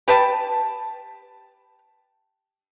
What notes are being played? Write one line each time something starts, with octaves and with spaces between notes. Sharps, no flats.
G4 B4 G5 A5